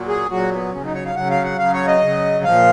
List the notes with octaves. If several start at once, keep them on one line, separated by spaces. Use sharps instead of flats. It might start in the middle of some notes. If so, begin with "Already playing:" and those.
Already playing: A#2 F#3
G#4
A#2 F#3 F#4
B3
C#3 F#3 C#4
D#4
C#5
F5
C#3 F#3 F#5
F5
F#5
C#3 F#3 F5
C#5
D#5
C#3 F#3
A#2 F3 F5